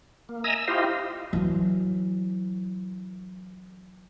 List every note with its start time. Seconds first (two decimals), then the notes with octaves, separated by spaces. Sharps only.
0.29 A#3
0.44 D#5 E5 G#5 A#5 D#6 E6
0.56 E6
0.68 E4 F4 G4 C5 D#5 F5
1.33 E3 F#3